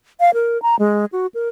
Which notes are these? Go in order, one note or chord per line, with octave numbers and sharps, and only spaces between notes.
F5
A#4
A#5
G#3
F#4
A#4